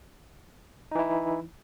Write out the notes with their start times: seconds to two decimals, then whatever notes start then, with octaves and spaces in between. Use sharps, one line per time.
0.91 D#4
0.95 E3
0.99 E4